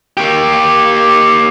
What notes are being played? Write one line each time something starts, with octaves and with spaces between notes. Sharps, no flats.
A#3 G4